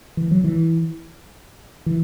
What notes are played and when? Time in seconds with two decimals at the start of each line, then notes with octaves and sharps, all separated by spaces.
0.17 E3
0.31 F#3
0.44 E3
1.86 E3